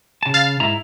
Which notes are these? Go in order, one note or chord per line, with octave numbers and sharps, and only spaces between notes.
C#3 A5
F5 A6
G#2 E4 A#5